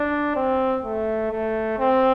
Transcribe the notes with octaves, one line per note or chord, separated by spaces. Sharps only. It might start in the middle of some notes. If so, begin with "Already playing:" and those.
Already playing: D4
C4
A3
A3
C4